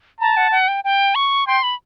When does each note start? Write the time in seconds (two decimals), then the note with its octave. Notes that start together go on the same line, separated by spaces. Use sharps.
0.21 A5 A#5
0.37 F#5
0.51 F#5
0.68 G5
0.84 G5
1.15 C#6
1.47 G5 C6
1.63 B5